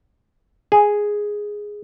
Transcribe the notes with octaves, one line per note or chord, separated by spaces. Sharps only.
G#4